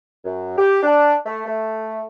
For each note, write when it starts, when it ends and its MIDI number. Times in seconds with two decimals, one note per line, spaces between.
0.24 0.57 42
0.58 0.82 67
0.83 1.15 62
1.26 1.44 57
1.46 2.03 57